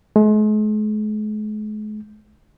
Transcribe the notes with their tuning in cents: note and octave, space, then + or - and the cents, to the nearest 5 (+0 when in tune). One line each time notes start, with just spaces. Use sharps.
G#3 +45